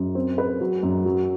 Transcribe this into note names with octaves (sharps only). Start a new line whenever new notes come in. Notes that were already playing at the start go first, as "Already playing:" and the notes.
Already playing: F#2
C4
B4
F#3
F#2
F#3